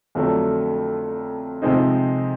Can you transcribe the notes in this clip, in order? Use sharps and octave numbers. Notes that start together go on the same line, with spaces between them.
F2 D3 F#3 A3 D4
C3 F3 G#3 C4 D#4